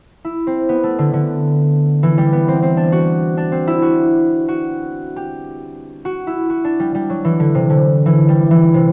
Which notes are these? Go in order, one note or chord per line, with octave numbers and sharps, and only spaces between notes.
E4
C4
B3
A3
D3
D3
E3
G3
B3
C4
C4
D4
F#4
D4
C4
E4
F#4
F#4
G4
F#4
E4
F#4
D4
G3
G3
F#3
E3
D3
C3
D3
E3
G3
E3
C3